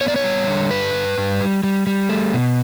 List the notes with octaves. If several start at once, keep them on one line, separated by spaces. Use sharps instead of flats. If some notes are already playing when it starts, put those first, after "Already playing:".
B3 C#5
D5
C#5
G3
D3
G2 B4
G2
G2
G3
G3
G3
A3
B2